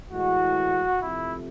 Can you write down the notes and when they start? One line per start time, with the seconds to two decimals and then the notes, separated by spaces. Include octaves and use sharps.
0.11 A2 E3 G#3 F#4
1.01 C3 F3 A3 E4